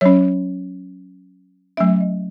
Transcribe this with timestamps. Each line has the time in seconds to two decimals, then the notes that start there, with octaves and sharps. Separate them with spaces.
0.01 F#3 C#4 C#5
1.77 F#3 A3 C#4 E5
2.00 D#5